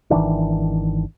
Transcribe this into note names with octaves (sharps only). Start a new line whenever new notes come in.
G#1 D#3 E3 D4